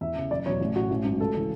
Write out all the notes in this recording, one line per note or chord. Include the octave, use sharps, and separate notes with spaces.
E2 E5
C#3 E3
F#1 D5
E2 B2 F#3 C#5
A1
A2 F#3 F#4
A1
G#2 F#3
C#2 A4
C#3 E3